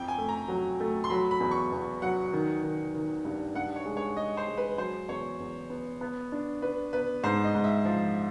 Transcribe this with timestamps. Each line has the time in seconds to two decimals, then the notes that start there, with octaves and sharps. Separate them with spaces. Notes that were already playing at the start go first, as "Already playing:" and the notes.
Already playing: F2 G5
0.08 G#5
0.18 A3
0.29 A#5
0.48 F#3
0.80 A3
1.04 C6
1.10 F#3 B5
1.31 B5
1.40 E2
1.51 C#6
1.72 E2
2.02 F#3 F#5
2.33 D#3
2.63 D#3
2.94 D#3
3.25 G2
3.55 G2 F#5
3.76 C#5
3.86 G#3
3.97 C#5
4.17 G#3 D#5
4.37 C5
4.48 G#3
4.57 B4
4.78 F#3 C5
5.09 E2 C#5
5.40 E2
5.70 B3
6.01 B3
6.32 D4
6.62 D4 B4
6.93 B3 B4
7.23 G#2 C5
7.44 D#5
7.55 G#2
7.64 E5
7.85 F3